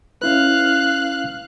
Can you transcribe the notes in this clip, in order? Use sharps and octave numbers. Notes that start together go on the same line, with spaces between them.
C#4 E4 B4 F5 F#6